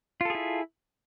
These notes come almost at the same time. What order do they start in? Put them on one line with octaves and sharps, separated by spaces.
F4 A4 G#4 E4